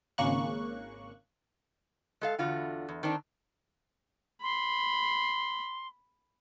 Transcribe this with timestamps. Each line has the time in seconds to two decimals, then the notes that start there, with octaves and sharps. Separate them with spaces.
0.18 G#1 C#3 A#3 C#6 F#6
2.21 G#3 A4 F5
2.38 E2 D3 F4 F#4
2.89 E2
3.03 D#3 C4 D4 D#4
4.42 B5 C6